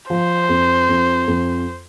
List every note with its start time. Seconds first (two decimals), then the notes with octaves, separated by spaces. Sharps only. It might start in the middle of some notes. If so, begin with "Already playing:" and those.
0.10 F3 C5
0.49 F2
0.89 F2
1.28 F2